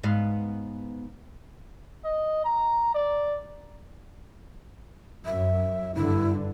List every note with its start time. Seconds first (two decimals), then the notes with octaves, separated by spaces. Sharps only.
0.03 G#2 B3 F5
2.05 D#5
2.45 A#5
2.95 D5
5.26 F#2 E5
5.95 G2 D3 E4